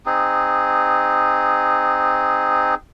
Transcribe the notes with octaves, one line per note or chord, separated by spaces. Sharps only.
C4 D#4 G#4